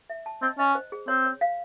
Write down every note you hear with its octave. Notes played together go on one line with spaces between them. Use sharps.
E5
A5
C4 D#5
C#4 D#5
C5
G#4
C4 C#5
C#5
F5